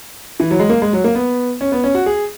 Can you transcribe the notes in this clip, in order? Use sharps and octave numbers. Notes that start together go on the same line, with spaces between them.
E3
F#3
G#3
A#3
G#3
F#3
A#3
B3
C#4
B3
C#4
F#4
G#4